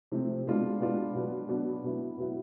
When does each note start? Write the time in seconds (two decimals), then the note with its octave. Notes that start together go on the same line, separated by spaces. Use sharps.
0.12 C3 F3 A3 C4
0.47 B2 G#3 B3 D4 F4
0.80 B2 G#3 B3 D4 F4
1.15 B2 F#3 B3 D4
1.49 B2 F#3 B3 D4
1.84 B2 F#3 B3 E4
2.18 B2 F#3 B3 E4